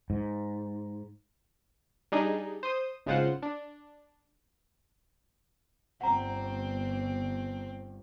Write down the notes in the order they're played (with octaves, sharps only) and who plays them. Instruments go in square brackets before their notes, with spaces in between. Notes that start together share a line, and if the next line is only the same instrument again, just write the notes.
[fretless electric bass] G#2
[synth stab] G3 D4 D#4 G#4
C5 D#6
G#1 C#3 G#3 F4 C5 F#5
D4
[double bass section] G1 [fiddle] C4 [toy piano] F#5 A#5